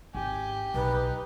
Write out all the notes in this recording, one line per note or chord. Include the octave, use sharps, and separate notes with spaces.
G#1 G4 G#5
B1 D#4 B4